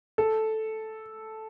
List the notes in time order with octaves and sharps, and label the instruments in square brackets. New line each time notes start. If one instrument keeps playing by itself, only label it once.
[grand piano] A4